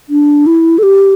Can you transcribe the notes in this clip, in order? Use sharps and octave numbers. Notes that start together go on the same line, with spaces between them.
D4
E4
A4
G4